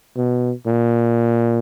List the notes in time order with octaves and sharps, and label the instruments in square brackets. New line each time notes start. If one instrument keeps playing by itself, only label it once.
[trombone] B2
A#2